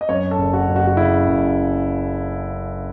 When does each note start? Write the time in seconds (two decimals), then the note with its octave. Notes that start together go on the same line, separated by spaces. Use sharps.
0.01 D#5
0.09 F#2 C#5
0.31 A4
0.38 F#1
0.53 F#4
0.68 F#1
0.76 F#4
0.87 F#4
0.97 C#3 E4
1.27 F#1